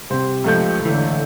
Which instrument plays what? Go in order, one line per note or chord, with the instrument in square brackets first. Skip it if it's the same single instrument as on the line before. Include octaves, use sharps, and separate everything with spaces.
[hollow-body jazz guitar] C2 C3 [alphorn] G4 [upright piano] C5
[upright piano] C#2 A3 G6 [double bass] F3
[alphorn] A2 [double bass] D3 [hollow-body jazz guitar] E3